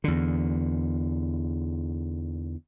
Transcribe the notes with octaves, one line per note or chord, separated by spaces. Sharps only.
E2 D3